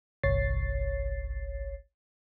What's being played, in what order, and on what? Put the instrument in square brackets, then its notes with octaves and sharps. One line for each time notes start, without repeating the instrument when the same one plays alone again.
[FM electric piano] G1 C2 C#5 A6 C7